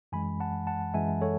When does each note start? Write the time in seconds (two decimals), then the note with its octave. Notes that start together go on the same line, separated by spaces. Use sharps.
0.12 F#2 E3 G#3 G#5 B5
0.40 F#5 A5
0.67 F#5 A5
0.94 F#2 E3 G#3 E5 G#5
1.21 A4 C#5